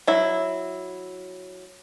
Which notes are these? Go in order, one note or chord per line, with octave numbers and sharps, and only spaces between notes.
F#3 E4